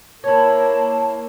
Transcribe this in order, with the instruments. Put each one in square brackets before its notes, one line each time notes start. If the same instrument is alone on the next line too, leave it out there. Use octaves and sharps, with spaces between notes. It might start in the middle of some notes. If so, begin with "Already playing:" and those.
[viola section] A#3 [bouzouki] E4 C#5 [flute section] A5